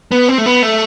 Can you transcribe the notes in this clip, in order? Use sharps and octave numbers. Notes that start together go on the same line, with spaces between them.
B3
C4
A3
B3
A3